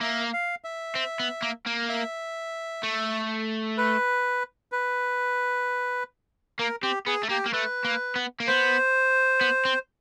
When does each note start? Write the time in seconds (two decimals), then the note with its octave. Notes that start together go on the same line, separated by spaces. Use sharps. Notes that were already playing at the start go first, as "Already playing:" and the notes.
0.01 A#3 E5
0.33 F5
0.64 E5
0.95 C4
1.20 B3
1.42 A#3
1.67 A#3
1.89 E5
2.83 A3
3.78 B4
4.72 B4
6.59 A#3 A#4
6.83 C4 G4
7.07 B3 G#4
7.23 A3
7.29 A#3 G4
7.46 A#3
7.53 A3 B4
7.85 A#3
8.16 B3
8.40 A#3
8.47 B3 C5
9.41 B3
9.65 C4